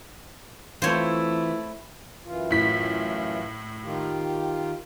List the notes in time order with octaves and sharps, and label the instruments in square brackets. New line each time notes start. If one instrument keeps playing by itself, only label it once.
[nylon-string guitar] E3 C4 F4 [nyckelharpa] A3 E4 [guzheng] C5 C#5
[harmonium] F#2 E3 F4
[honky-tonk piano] A2 B6
[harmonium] D#3 F4 G4